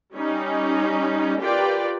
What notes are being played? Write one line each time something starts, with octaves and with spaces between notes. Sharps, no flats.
G3 C#4 D#4
F4 G4 A#4 B4 D5 G5